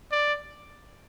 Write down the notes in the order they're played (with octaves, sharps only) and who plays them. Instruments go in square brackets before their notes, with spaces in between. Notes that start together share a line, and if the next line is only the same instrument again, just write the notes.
[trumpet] D5